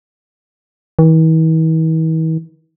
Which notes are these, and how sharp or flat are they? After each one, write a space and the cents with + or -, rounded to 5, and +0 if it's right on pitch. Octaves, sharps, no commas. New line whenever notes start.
E3 -45